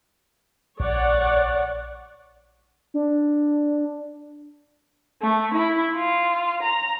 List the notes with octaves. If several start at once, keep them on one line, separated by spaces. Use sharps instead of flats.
A#1 C#5 D5 F#5
D4
A3
E4
F4
A#5